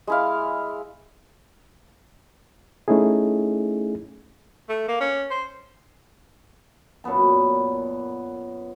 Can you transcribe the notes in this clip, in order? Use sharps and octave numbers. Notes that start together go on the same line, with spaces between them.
G#3 E4 F5
A3 C#4 D#4 E4 G#4
A3
A#3
C#4
C5
F#2 A#2 B3 A5